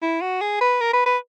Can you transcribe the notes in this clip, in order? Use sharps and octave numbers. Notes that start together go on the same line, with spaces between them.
E4
F#4
G#4
B4
A#4
B4
B4